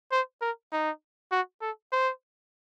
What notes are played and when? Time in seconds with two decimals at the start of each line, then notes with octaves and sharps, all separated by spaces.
0.12 C5
0.41 A#4
0.72 D#4
1.32 F#4
1.61 A4
1.92 C5